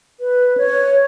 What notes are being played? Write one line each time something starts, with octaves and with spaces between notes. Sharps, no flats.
B4
C#5